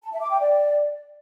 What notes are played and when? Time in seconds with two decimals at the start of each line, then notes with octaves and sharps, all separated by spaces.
0.03 A5
0.12 E5
0.21 D6
0.30 G5
0.39 D5